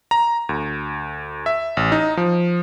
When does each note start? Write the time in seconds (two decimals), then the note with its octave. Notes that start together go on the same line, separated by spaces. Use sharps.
0.11 A#5
0.49 D2
1.46 E5
1.77 A1
1.92 D#4
2.17 F3